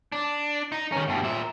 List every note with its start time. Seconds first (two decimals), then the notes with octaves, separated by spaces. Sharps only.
0.12 D4
0.72 D#4
0.92 D#3 C#4
1.08 G2 B2
1.23 A#2 E5